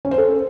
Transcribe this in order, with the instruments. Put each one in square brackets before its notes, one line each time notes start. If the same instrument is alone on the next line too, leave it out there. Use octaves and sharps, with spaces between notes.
[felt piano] C#4
C5
A4